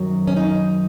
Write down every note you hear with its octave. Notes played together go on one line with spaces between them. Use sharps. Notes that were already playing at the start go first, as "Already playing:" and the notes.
Already playing: F#2 D#3 F#3
C#4
D#4